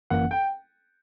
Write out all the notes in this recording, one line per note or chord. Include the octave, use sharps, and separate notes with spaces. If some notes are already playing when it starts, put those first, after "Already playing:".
G1 F#2 E3 A#3 C#4 F#5
G5